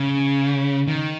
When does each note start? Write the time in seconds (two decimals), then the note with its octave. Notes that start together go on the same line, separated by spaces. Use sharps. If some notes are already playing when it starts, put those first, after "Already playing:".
Already playing: C#3
0.87 D#3